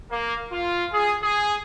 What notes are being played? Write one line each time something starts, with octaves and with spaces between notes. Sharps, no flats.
A#3
F4
G#4
G#4